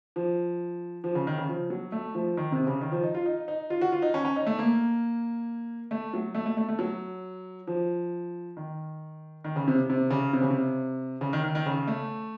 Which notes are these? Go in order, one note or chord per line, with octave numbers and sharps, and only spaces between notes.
F3
F3
C#3
D#3
C#3
F3
F#3
A3
F3
D#3
C3
C#3
D#3
F3
D#4
F4
D#4
D#4
F4
F#4
F4
D#4
C#4
C#4
D#4
A3
A#3
A3
F#3
A3
A3
A3
A3
F#3
F3
D#3
D#3
C#3
C3
C3
C#3
C3
C#3
C3
C#3
D#3
D#3
D#3
C#3
A3